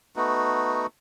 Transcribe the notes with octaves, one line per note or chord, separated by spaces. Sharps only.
A3 B3 D#4 F#4